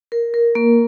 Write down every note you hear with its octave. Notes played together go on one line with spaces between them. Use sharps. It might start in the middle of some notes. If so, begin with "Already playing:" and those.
A#4
A#4
A#3